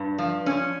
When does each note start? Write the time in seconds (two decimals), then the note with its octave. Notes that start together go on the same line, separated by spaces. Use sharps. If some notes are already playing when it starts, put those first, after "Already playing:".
Already playing: G2
0.18 F3
0.46 C#4